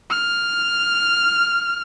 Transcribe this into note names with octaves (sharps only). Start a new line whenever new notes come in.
F6